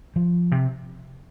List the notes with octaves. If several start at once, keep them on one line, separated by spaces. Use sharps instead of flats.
F3
C3